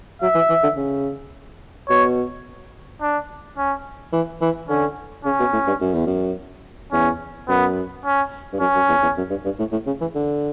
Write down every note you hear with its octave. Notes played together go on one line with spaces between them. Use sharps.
F#3 E5
E3
E3
D3
C#3
B2 C#5
D4
C#4
E3
E3
D3 C#4
C#3 C#4
B2
A2
G2
F#2
E2
F#2
E2 C#4
F#2 B3
C#4
G2
F#2 C#4
F#2
E2
E2
F#2
G2
G2
A2
A2
C#3
E3
D3